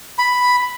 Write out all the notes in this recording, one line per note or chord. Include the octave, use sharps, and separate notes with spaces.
B5